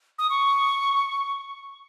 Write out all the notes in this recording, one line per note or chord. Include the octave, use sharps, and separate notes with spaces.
D#6
C#6